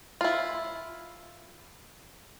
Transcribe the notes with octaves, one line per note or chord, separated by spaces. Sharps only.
E4 F4